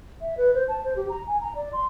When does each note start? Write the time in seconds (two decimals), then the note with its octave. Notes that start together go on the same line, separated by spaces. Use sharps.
0.21 E5
0.37 B4
0.54 C5
0.68 A5
0.84 C5
0.96 G4
1.09 A#5
1.27 G#5
1.41 A#5
1.55 D5
1.73 C6